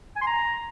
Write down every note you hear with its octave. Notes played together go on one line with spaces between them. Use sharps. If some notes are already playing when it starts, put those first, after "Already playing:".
G#5
C6
A#5